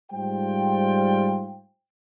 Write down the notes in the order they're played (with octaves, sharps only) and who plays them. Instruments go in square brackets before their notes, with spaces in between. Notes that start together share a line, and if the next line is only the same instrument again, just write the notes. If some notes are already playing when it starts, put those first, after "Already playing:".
[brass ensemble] G#2 G3 F4 C5 G5